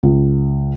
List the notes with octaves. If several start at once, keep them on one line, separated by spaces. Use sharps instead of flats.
C#2